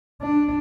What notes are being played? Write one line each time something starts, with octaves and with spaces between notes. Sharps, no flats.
D4